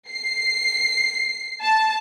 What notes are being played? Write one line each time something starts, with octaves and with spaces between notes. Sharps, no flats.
C7
A5